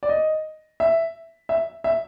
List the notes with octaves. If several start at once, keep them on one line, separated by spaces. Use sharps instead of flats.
D5
D#5
E5
E5
E5